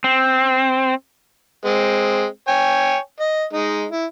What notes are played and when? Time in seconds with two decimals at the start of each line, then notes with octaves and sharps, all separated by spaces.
0.04 C4
1.65 G#3 C4
2.48 C#5 G5 G#5
3.20 D#5
3.53 G#3 D#4
3.91 E4